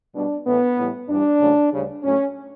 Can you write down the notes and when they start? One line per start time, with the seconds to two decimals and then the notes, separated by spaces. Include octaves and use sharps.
0.15 B2 G3 D4
0.46 A2 E3 A3 B3
0.78 A2 E3 G3
1.09 G2 E3 G3 D4
1.41 E2 C#3 F#3 A3
1.73 D2 C#3 G3
2.03 A2 F#3 A3 C#4